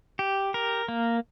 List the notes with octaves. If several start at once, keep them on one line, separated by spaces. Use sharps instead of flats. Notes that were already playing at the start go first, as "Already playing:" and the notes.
G4
A#4
A#3